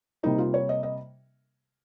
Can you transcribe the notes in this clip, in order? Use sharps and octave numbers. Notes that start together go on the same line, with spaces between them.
C3 G3 A#3 D#4
F4
C#5
D#5
D#5